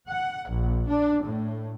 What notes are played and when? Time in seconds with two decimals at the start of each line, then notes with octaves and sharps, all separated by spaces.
0.10 F#5
0.49 A#1
0.88 D4
1.24 A2